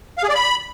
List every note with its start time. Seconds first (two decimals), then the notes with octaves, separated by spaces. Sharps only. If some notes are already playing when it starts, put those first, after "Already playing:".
0.18 F5
0.24 G#4
0.29 D5
0.35 B5